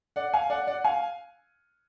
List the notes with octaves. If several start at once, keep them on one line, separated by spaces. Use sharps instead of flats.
D5 F#5
F5 G#5
D5 F#5
D5 F#5
F5 G#5